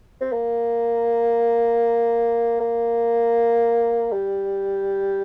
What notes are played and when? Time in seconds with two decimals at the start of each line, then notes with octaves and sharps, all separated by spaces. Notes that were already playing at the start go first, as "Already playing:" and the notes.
0.21 C4
0.33 A#3
2.60 A#3
4.12 G3